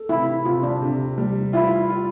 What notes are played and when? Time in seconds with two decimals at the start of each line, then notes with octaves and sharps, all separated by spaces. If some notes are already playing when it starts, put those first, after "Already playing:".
Already playing: A4
0.09 C3 E4
0.45 C3 F4
0.63 D4
0.81 C3
1.18 G3
1.53 E4 F4
1.90 F4